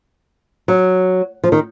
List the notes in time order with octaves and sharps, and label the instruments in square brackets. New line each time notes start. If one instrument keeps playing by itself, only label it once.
[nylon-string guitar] F#3
F3
D#3